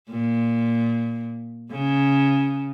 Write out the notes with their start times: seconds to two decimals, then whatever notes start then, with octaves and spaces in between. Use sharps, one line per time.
0.10 A#2
1.71 C#3